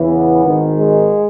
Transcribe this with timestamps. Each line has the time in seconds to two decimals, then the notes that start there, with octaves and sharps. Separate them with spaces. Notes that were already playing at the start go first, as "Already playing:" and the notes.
Already playing: E2 C#3 E3
0.09 B3
0.43 G#1 G#2 D#3
0.78 G#3